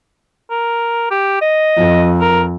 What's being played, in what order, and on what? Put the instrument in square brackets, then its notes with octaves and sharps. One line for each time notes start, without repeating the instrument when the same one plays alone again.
[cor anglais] A#4
G4
D#5
[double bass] F2
[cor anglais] A#4